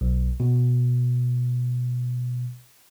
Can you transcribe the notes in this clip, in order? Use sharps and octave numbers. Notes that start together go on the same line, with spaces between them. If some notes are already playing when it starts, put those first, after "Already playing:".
B1
B2